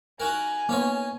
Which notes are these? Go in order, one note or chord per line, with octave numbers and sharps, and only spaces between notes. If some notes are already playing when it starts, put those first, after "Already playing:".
D#4 F#4 A#4 G#5
A#3 B3 C#4 D#4 C#5